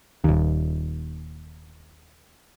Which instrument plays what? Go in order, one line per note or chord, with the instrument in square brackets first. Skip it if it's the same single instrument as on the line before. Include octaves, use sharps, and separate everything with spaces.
[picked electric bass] D#1 D#2